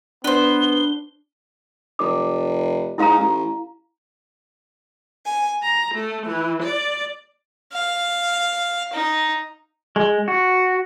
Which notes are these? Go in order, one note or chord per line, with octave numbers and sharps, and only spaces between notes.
B3 D4 B4 C5 G7
F1 D6
G#2 E4 F5 A#5
A1
G#5
A#5
A3
E3
D5
F5
D#4
G#3
F#4